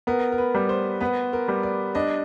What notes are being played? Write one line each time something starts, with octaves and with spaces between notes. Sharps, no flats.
B3 A#4
A#4
B4
G3
C5
B3 B4
A#4
G3
D5
D4 D#5